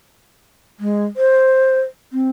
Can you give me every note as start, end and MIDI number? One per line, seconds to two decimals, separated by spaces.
0.80 1.05 56
1.17 1.80 72
2.13 2.29 60